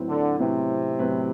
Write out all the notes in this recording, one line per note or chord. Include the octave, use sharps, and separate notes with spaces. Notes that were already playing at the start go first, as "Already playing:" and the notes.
Already playing: A2 F#3 C4 E4 B4
D3
A2 C3 F#3 C4 E4 B4
A2 F#3 C4 E4 B4